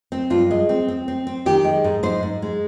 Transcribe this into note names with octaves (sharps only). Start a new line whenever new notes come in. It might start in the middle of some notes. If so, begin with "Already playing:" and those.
C4
G2 F4
G#3
C4
C4
C4
C4
D#3 G4
G#3
G#2
G#2 C5
G#2
G#3